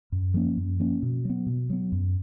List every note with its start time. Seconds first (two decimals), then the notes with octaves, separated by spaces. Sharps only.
0.12 F#2
0.34 F3 A#3 C#4
0.57 F#2
0.79 F3 A#3 C#4
1.03 B2
1.25 F#3 B3
1.46 B2
1.70 F#3 B3
1.92 F#2